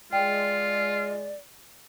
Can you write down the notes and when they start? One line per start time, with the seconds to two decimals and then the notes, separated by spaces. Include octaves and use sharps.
0.13 G#3 F4 D5 G5